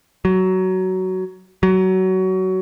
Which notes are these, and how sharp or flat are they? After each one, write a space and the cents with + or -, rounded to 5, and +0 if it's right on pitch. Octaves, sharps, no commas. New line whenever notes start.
F#3 +15
F#3 +20